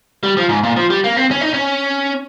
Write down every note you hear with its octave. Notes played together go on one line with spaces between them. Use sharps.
G3
F3
G#2
A#2
F3
G3
A#3
C4
C#4
D#4
C#4